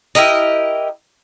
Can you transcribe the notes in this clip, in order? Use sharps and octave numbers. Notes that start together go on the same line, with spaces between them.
E4 G4 A#4 D#5